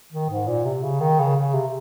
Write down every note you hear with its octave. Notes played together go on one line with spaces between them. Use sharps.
D#3
G#2
A#2
C3
C#3
D#3
C#3
C#3
C3